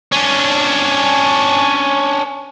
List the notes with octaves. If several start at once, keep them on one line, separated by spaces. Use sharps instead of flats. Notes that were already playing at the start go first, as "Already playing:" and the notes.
C#4 D4